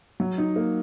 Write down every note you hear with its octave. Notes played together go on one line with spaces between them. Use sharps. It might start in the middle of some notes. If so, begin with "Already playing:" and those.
F#3
D#4
A#3